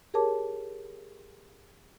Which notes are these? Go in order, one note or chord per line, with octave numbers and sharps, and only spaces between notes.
G4 G#4 A#4 C#5 A5 D6